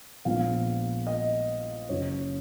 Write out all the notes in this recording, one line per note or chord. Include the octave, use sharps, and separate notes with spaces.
A#1 A#2 F3 G#3 B3 F5
D#5
F#1 F#2 C#3 C#5